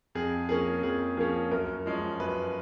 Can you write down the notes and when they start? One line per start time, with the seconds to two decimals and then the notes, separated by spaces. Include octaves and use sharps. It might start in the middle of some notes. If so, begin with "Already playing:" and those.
0.15 F2 G#4
0.49 F3 A#3 C#4 G#4
0.83 F2 G#4
1.17 F3 A#3 C#4 G#4
1.51 F#2 A#4
1.86 F3 G#3 C#4
2.20 F#2 B4